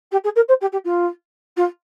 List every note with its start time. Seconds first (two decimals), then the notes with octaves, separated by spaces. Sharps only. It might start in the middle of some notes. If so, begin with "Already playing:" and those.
0.11 G4
0.24 G#4
0.36 A#4
0.48 C5
0.61 G4
0.72 G4
0.84 F4
1.57 F4